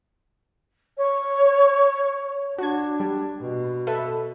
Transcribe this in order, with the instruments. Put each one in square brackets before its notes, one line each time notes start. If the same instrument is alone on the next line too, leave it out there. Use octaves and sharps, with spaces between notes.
[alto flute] C#5
[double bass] D4 [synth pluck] F#4 G#6
[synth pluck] G3
[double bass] B2
[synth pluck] A4 B4 E5